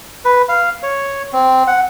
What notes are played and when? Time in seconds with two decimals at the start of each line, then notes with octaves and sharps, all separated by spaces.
0.25 B4
0.49 F5
0.83 C#5
1.33 C4
1.67 F#5